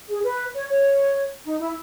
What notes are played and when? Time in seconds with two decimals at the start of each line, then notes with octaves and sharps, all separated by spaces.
0.08 G#4
0.23 B4
0.54 C#5
0.69 C#5
1.45 D#4
1.60 E4